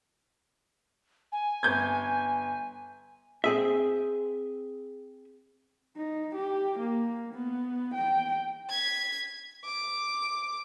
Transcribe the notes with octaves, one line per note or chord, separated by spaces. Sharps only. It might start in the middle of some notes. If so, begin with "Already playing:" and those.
G#5
G1 G6 G#6
C4 G#4 E5
D#4
G4
A#3
B3
G5
G#6 B6
D6